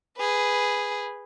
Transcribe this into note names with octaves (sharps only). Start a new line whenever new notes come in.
G#4 B4